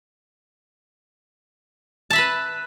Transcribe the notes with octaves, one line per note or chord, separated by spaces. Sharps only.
B4 E5 A5 B5